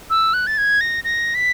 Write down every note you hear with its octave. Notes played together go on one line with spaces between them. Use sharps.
E6
F#6
A6
G#6
A#6
A#6
B6